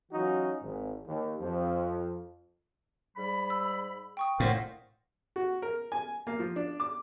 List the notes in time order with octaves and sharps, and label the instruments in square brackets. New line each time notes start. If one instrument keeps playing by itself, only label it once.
[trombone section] E3 F#3 C#4 D#4 F4 F#4
G#1 G#2
D#2
F2 F3
[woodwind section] G#2 G3 B5
[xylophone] E6
G5 C#6 D#6
[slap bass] A2 [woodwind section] D4 A#4 C5 [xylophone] F5 F#5
[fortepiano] F#4
A#4
G#5
A#3
F3
D4
D6